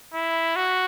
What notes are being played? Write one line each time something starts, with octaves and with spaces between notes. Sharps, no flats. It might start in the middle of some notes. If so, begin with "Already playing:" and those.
E4
F#4